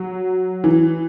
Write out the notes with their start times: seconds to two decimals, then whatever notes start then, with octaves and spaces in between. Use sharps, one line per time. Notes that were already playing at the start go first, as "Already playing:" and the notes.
Already playing: F#3
0.64 E3